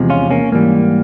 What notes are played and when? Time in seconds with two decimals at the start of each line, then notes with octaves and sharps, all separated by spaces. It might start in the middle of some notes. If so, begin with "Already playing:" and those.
Already playing: E2 C3 F3 G#3
0.10 C#4 F4
0.31 A#3 C#4
0.52 G#2 E3 G3 A#3